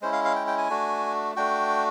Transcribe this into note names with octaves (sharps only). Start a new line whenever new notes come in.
G#3 C#4 E4 C5
F5
F5
G5
G5
G#5
A3 D4 F#4
A3 D4 F#4 G5